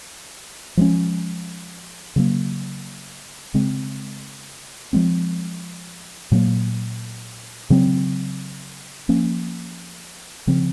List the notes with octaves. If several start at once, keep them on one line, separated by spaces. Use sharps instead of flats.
F3 G#3 C#4
C#3 F#3 A#3
C#3 G#3 C4
F3 G#3 C4
A#2 F#3 A#3
C#3 F#3 C4
F3 A#3 C#4
C#3 F3 C4